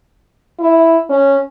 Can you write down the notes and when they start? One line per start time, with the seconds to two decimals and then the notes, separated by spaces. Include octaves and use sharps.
0.59 E4
1.10 C#4